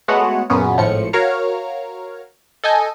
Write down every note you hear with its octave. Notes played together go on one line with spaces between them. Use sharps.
G#3 A3 B3 F#4 C#5 F#5
F#2 A#2 C#3 B3 C#4
G#1 A2 F3 C#7
F#4 A#4 C#5 F5 A#5 F6
A4 D#5 G#5 G6